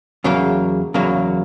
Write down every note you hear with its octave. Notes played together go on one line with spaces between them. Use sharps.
E2 C#3 F#3 A#3
E2 C#3 F#3 A#3